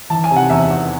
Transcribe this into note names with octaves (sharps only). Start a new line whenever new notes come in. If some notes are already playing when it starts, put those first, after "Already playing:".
E3 A5
G#5
C3
F#5
E2 E5
E2